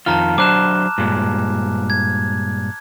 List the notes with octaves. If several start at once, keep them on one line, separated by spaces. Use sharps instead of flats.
F2 D#3 F4 A5 A#5 F6
F#3 D4 C5 D6 F#6 E7
G2 A#2 G#3
G#6